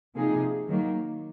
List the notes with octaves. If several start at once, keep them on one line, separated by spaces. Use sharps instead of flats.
C3 F3 A#3 D#4 G#4
D#3 F#3 A#3